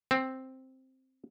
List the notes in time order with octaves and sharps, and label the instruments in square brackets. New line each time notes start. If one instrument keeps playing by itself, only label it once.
[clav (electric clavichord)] C4